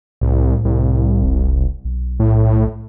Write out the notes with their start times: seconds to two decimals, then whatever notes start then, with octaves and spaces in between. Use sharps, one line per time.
0.21 C2 A2
0.65 C2
1.24 E1
1.85 B1
2.20 A2